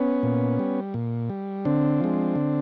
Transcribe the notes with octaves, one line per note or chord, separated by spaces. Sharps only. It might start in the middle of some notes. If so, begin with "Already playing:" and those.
Already playing: B3 C#4
A#2
G3
A#2
G3
D3 C4 D4
F3 G#3
D3